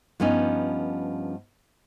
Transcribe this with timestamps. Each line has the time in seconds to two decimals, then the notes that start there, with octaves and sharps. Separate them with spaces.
0.20 G2 F3 B3 C#4 D#4